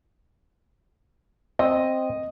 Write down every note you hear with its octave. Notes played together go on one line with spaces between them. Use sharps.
C4 D#5